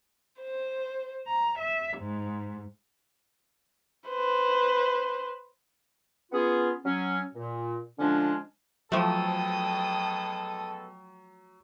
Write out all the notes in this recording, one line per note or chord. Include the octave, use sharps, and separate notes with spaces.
C5
A#5
E5
G#2
B4 C5
B3 C#4 F4 G#4
F#3 C#4
A#2
D3 F3 G#3 C#4 D4
B2 F3 F#3 G#3 A3 A4 G5 D#6